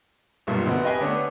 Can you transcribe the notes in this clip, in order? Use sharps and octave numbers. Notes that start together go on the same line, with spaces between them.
B1 G2 A#2
D2 B2 B3 C4
G4 B4 D#5 F5 G5 G#5
D3 A3 B3 C#4 D4